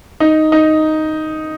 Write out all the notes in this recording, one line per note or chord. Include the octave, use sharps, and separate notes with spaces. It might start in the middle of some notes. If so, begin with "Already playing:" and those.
D#4
D#4